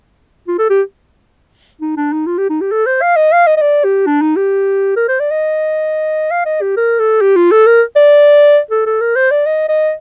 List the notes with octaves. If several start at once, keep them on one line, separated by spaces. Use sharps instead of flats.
F4
A4
G4
D#4
D4
D#4
F4
G4
D#4
G4
A4
C5
F5
D#5
F5
D#5
D#5
D5
G4
D4
D#4
G4
A#4
C5
D5
D#5
F5
D#5
G4
A#4
A4
G4
F4
A4
A#4
D5
A4
A4
A#4
C5
D5
D#5
D#5